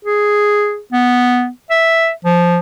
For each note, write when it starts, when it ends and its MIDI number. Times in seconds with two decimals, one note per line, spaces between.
0.05 0.80 68
0.92 1.49 59
1.70 2.10 76
2.25 2.59 53